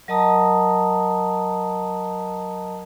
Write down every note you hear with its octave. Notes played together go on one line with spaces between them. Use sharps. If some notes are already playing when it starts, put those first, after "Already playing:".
F#3 A#4 D#5 A5 A#5 D#6